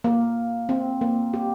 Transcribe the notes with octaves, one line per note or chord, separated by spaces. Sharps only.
A#3
C4
A#3
G4